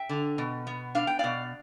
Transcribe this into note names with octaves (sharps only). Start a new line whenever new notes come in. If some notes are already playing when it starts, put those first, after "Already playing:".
Already playing: E5 G5
D3
B2
B3
D4 F5
G5
B2 D5 F5